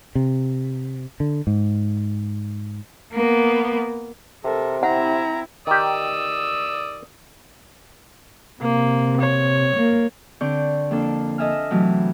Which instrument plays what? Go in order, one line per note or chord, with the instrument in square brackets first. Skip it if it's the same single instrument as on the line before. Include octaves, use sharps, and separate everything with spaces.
[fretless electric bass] C3
D3
G#2
[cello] A#3 B3
[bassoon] C3 [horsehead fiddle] A4 A#4
[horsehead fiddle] C4 E4 [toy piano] F#5 [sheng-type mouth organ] A#5
[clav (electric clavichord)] D#3 G4 [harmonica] D5 D#6 E6
[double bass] C3 [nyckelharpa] A#3
[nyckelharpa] C#5
[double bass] A#3
[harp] D3 C4 D5 C#6 G6
F2 A#3 D4 A4
A4 D#5 E5 G#5 F6
C3 E3 F#3 A3